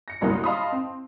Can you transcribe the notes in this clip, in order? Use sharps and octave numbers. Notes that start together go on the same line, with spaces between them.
A#6 C#7
G1 C2 F#2 A#3 B3 D#6
D#5 F5 A5 B5 C6 D#6
C4